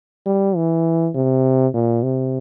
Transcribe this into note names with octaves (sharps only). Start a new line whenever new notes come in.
G3
E3
C3
A#2
C3